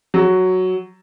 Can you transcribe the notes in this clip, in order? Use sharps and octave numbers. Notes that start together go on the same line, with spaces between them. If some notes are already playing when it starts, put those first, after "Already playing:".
F#3